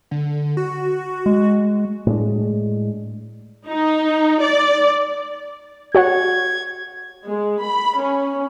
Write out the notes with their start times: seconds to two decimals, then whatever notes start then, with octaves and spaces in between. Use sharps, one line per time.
0.11 D3
0.57 F#4
1.26 G#3
2.06 A2 G#3 D4
3.67 D#4
4.40 D5
5.95 F#4 C#5 F#5 G#6
7.30 G#3
7.63 B5
8.02 C#4